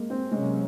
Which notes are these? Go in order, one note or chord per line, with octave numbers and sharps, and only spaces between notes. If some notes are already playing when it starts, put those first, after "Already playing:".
Already playing: G#3 A#3
C4
C3 F#3 G#3 A#3 C#4